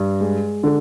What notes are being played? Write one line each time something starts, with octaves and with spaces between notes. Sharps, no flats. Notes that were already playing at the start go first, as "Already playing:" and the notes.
Already playing: G2
G#3
D3